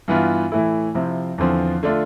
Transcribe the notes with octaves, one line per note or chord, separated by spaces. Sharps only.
G2 E3 B3 F4
A2 E3 A3 E4
C3 F3 C4 E4
E2 D3 F3 C4
D3 A3 D4 F4